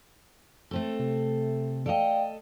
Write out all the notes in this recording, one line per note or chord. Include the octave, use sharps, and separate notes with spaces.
A3 C4 A4
C3
A4 D5 D#5 F5 G5